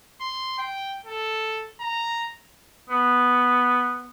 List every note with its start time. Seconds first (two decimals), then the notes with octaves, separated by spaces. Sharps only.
0.21 C6
0.58 G5
1.05 A4
1.81 A#5
2.90 B3